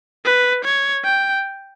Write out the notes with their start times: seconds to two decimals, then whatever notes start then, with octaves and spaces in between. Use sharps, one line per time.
0.25 B4
0.64 C#5
1.04 G5